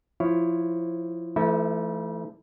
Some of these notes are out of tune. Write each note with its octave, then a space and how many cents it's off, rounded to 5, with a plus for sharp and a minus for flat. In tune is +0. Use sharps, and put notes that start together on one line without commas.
F3 +0 E4 +10 C#5 +0
E3 +45 A3 +0 E4 -45